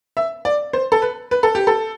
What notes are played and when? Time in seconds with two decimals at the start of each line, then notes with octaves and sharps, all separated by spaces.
0.17 E5
0.45 D5
0.73 C5
0.92 A4
1.02 B4
1.31 B4
1.43 A4
1.55 G4
1.67 A4